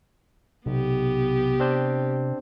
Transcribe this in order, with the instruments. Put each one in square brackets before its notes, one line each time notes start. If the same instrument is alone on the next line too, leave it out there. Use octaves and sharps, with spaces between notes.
[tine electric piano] B1 [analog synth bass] C3 [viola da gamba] B3 G4
[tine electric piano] C4 D4 C5